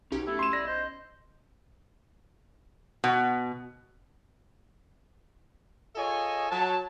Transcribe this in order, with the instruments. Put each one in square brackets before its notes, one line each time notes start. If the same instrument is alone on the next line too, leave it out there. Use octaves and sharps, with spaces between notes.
[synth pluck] B1 C#4 G4 [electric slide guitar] D#4
[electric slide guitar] A3 [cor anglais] E4
[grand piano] C6 E7
[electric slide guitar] D5 [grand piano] A#6
[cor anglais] C5 [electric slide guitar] D#5
[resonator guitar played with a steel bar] B2
[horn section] F4 G#4 A4 C#5 D#5 G#5
F#3 A5